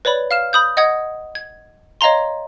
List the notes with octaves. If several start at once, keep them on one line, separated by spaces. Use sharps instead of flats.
B4 C#5 D5 B5
F5 F6 E7
B5 D#6 G6
D#5 F#5 D#6 G#6
G#6
C#5 D#5 F5 A#5 C6